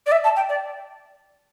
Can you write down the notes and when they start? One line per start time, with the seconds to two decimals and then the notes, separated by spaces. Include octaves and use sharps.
0.07 D5
0.12 E5
0.24 A5
0.36 G5
0.49 D5